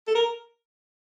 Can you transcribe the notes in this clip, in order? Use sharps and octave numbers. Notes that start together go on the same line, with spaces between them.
A4
A#4